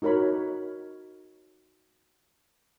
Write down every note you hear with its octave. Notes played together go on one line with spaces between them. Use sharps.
D#4 F#4 A#4 C#5 B5